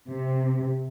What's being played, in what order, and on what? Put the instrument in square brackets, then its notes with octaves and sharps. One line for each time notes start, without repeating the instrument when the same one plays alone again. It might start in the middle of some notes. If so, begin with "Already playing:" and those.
[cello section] C3